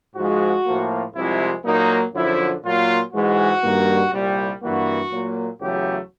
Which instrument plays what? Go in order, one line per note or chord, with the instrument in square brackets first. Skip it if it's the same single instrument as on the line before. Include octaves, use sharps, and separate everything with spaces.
[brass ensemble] G#2 F3 G#3 F#4
A2 F3 A#3
C2 C3 F3 G#3 E4
A#2 F#3 A#3 D#4
F#2 D3 F3 E4
A#2 F#3 A#3 F4
G#2 E3 G#3 F#4
G2 D#3 G3 A#3
C2 A#2 G3
G2 E3 G3 A#3 F#4
A#2 F#3 A#3
E2 C#3 F#3 A3 G4